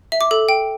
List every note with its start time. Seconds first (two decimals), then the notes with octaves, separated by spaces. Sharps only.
0.12 E5
0.21 D6
0.31 A4
0.49 G5